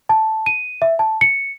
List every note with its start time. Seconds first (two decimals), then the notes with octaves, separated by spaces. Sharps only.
0.09 A5
0.46 D#7
0.82 E5
0.99 A5
1.21 C#7